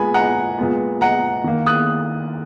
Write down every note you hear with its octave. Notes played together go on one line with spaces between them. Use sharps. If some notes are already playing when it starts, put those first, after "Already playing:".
Already playing: A#2 G#3 B3 G#5 B5
F#5 A#5
A#2 G#3 B3
F#5 A#5
D#3 A#3
D#6 F#6